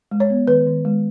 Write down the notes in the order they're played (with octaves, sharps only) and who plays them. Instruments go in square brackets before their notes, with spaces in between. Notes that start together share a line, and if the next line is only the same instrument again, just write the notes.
[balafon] G#3
C#5
B3
D#3 B4
D#3
G#3